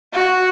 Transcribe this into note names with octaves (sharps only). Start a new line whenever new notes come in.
F#4